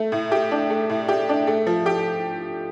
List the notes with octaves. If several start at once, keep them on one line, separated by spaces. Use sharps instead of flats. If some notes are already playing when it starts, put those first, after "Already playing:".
Already playing: A3
A2
G4
D4
A3
A2
G4
D4
A3
F3
G4